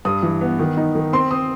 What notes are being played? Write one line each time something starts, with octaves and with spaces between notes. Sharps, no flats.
G2 D#6
E3
B3
D#3
D#4
D#3
C4 C6
C4 D#6